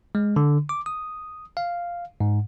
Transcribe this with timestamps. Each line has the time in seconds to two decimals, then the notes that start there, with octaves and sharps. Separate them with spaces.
0.15 G#3
0.36 D3
0.69 D6
0.86 D#6
1.57 F5
2.20 G#2